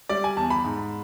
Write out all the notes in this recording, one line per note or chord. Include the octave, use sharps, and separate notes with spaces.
G3 D5
G#5
E2 A5
B5
G#2